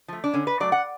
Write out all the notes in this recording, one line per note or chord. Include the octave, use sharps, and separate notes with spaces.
F3 A3
D4
D3 C#4
B4
F#3 A3 D5
F#5